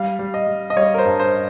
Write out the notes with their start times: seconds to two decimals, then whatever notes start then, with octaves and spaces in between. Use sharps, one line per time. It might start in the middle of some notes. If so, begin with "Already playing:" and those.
Already playing: G3 F5
0.19 G3
0.34 D#5
0.47 G3
0.70 D#5
0.77 G3 C#5
0.94 A#4
0.98 C5
1.05 G2
1.20 C5